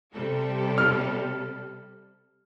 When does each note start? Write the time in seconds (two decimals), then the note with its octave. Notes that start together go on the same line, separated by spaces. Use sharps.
0.12 C3 G3 A4
0.78 F6